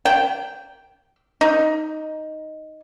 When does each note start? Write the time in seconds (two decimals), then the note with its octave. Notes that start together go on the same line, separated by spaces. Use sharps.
0.05 G5
1.41 D#4